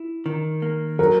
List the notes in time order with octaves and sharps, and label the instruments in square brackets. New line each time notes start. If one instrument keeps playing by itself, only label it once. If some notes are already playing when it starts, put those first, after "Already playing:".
Already playing: [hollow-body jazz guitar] E4
D#3
A#3
[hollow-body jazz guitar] F#3 [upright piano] A#4